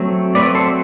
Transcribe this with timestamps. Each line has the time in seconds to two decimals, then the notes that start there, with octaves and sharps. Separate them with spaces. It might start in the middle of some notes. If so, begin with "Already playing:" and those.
Already playing: F#3 A3 C4
0.35 F#3 A3 C4 B4 D5
0.55 A4 C5